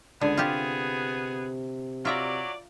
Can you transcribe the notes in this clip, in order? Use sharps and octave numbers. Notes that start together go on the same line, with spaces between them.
C#2 D3 B3 G#4 B4
C3 F4 G4
F#3 F4 D5 E5 A#5